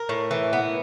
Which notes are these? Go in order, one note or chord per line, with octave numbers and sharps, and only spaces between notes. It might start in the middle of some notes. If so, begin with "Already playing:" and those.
Already playing: A#4
A2
E3
B3